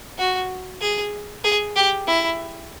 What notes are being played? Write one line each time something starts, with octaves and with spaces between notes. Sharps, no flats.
F#4
G#4
G#4
G4
E4